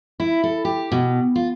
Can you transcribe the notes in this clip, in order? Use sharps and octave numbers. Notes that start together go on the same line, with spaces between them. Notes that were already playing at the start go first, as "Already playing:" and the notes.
E4
A4
G4
B2
F4